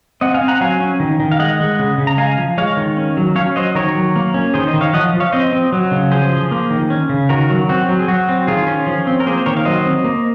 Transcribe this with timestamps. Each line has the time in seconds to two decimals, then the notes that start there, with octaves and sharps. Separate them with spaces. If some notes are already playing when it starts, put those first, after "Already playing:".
0.21 C4 D#5 F#5
0.34 F5 G#5
0.41 C4
0.48 F#5 A#5
0.61 F#3 F5 G#5
0.80 C#4
1.00 D#3
1.20 D#3
1.31 F5
1.39 G#3 D#5 F#5
1.60 G#3
1.79 C#3
1.98 C#3
2.07 A#5
2.17 G#3 F5 G#5
2.38 F3
2.58 G#3 C#5 F5
2.77 D#3
2.97 C#4
3.17 F#3
3.36 C#4 C#5 F5
3.56 F#3 C5 D#5
3.75 D#3 A#4 C#5
3.95 F#3
4.16 A#3
4.34 C#4
4.54 D#3 G#4 C5
4.67 C5 D#5
4.74 D#3
4.81 C#5 F5
4.94 F3 D#5 F#5
5.14 F3
5.20 C#5 F5
5.32 C4 C5 D#5
5.53 C4
5.73 F#3
5.91 C#3
6.11 F3 G#4 C5
6.32 F3
6.51 A#3
6.70 D#3
6.90 C#4
7.09 C#3
7.29 D#3 F#4 A#4
7.50 F#3
7.69 C4 F#4
7.88 F#3
7.99 G#4
8.08 F#3 F#4
8.29 C4
8.47 D#3 F4 G#4
8.67 C#4
8.87 F3
9.07 C4
9.20 A#4
9.26 A#3 G#4 C5
9.37 C5
9.46 D#3 A#4 C#5
9.57 F5
9.65 F#3 C5 D#5
9.86 C4
10.04 A#3